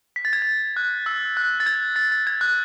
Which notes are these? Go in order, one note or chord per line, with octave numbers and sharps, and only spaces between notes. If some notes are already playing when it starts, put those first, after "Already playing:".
B6
A6
G#6
A6
F#6
E6
F#6
A6
G#6
A6
A6
G#6
F#6